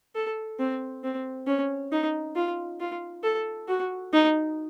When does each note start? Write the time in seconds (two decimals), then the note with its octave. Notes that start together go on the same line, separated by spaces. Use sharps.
0.15 A4
0.59 C4
1.03 C4
1.47 C#4
1.92 D#4
2.36 F4
2.80 F4
3.24 A4
3.68 F#4
4.13 D#4